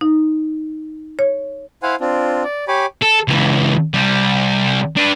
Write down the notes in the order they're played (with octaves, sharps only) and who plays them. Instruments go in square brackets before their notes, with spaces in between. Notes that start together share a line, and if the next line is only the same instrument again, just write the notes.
[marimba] D#4
C#5
[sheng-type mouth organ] E4 C5 F5 F#5 G#5
C4 D4 F4
D5
G4 C#5 G#5 B5 D6
[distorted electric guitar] A4
C#2 E3
C2 G3
D4 B4